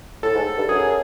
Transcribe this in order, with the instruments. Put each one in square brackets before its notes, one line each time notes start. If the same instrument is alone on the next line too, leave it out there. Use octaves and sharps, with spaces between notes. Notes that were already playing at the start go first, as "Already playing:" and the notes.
[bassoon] A2 [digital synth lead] A4
[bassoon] G#2
G2
[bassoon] F#2 [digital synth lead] G#4